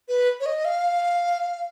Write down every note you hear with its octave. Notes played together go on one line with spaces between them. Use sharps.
B4
C#5
D#5
F5